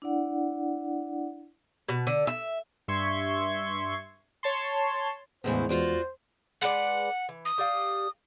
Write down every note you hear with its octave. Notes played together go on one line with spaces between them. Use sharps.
D4 E4 D5 F#5
B2
D3
E5
G2 E5 C6 C#6 G#6
C#5 A5 C6
E2 A2 C#3 E3 G#3 B3 C5
F4 F#4 C5 D5
G#3 B4 D5 F#5
E3
D#6
G4 D5 F5